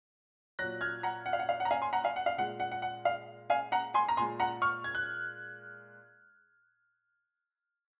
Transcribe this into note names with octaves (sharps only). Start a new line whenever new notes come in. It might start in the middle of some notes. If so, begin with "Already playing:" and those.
A#2 F#3 F#6 A#6
F6 G#6
F#5 A#5
F#5
F5
F#5
F5
F#5
A#5
F5 G#5
G#5 C6
F#5 A#5
F5 G#5
F#5
F5
A#2 G#3 F#5
F#5
F#5
F#5
F5
F5 G#5
F#5 A#5
G#5 C6
A#5
A#2 G#3 G#5 C6
F#5 A#5
C#6 F6
G#6
F#6